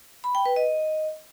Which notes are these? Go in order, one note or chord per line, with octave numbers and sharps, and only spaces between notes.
B5
G5
B4
D#5